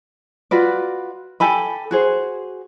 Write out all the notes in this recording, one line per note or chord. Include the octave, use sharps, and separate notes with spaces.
F4 F#4 B4 D5
G4 A4 G#5 B5
F#4 G#4 C5